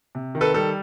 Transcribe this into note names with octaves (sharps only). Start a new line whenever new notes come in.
C3
D#3
A4 B4
G3 A4